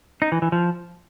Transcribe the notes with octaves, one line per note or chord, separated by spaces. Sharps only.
D#4
E3
E3
F3